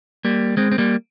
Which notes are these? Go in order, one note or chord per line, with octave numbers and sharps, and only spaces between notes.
G3 A#3
G#3 C4
C4
G3 A#3